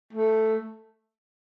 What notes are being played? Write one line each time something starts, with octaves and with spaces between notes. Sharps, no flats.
A3